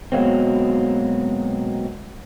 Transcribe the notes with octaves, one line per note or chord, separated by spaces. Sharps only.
B2 F#3 G#3 A#3 C4